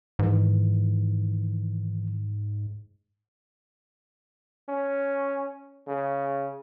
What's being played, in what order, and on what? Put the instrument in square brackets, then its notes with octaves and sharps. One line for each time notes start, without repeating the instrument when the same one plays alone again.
[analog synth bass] G#2 [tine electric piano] D#3 E3
[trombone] C#4
C#3